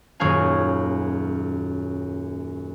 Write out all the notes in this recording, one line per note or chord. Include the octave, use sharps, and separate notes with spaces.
D#1 F#2 C#4 G#4 F5 G#5